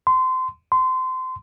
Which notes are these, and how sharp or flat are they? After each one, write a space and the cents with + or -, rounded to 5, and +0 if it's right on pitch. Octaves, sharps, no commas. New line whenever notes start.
C6 -25
C6 -25